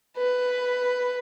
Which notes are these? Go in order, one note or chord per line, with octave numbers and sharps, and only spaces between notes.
B4